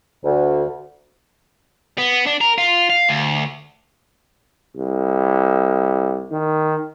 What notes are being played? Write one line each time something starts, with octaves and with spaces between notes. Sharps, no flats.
D2
B3
D4
A#4
F4
F5
D2
C2
D#3